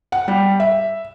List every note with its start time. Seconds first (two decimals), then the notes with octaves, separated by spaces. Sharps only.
0.12 F#5
0.28 G3
0.60 E5